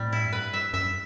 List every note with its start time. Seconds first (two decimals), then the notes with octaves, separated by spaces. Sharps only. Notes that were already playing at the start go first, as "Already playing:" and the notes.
Already playing: A2 C3 G3
0.12 E4
0.26 F#2
0.33 G2 B4
0.53 E5
0.74 F#2 E5